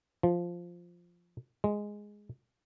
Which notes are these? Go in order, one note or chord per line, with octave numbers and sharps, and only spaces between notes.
F3
G#3